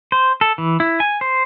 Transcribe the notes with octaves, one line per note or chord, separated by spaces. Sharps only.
C5
A4
E3
E4
G#5
C5